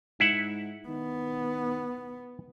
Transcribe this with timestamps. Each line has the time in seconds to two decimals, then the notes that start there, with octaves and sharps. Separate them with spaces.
0.20 G#2 E4 E5 F#5
0.88 D#3 B3